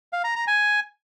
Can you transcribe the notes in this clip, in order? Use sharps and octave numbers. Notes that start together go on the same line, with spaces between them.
F5
A#5
A#5
G#5